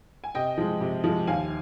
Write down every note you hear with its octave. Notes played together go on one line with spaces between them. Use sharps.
G#5
C3 D#5 G5
F3 G#3
C3
F3 G#3
D#2 F5 G#5